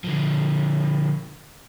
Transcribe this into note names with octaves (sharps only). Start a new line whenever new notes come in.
D3 F3